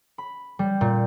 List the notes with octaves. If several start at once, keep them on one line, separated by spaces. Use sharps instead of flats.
B5
G3
A#2